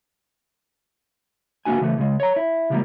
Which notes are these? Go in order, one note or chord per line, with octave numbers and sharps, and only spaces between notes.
C#2 A#3 B3 D4 F#4 G#5
C#3 E3 A3 B3
A2 C#3 G#3
C#5 A#5
E4
C#3 E3 F3 G3 G#3 A#3